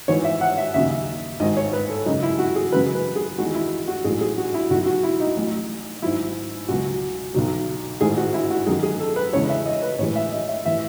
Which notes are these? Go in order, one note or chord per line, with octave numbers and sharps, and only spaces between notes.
G#1 G#2 E3 C#5
E5
F#5
E5
D#2 C#3 F#3 E5
G#1 G#2 D#3 D#5
C#5
B4
A4
F#2 C#3 G#3 D#4
E4
F#4
G#4
F#2 C#3 E3 G#3 B4
B4
G#4
E2 D#3 G#3 F#4
E4
F#4
A1 G#2 F#3 G#4
G#4
F#4
E4
B1 B2 F#3 F#4
F#4
E4
D#4
A1 A2 F#3
G#1 G#2 F#3 E4
C#2 B2 F#3 F#4
B1 B2 F#3
A1 G#2 D#3 G#4
F#4
E4
F#4
F#2 D#3 F#3 G#4
G#4
A4
B4
E2 C#3 G#3 C#5
E5
D#5
B4
A1 A2 E3 G#3 C#5
E5
D#5
E5
A2 E3 E5